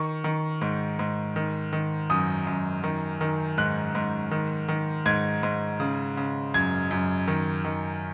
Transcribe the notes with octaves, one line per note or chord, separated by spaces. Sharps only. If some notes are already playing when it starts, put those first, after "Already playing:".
Already playing: D#3 C#6
D#3
G#2
G#2
D#3
D#3
F#2 D#6
F#2
D#3
D#3
G#2 F#6
G#2
D#3
D#3
G#2 G#6
G#2
C#3
C#3
F#2 G#6
F#2
D#3
D#3